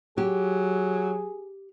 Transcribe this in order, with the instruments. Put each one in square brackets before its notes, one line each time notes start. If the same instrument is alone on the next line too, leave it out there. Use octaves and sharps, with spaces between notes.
[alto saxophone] F#3 [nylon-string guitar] G4 [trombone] G#4